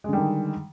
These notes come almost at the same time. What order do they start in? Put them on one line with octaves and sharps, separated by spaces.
G#3 D3 G3 D#3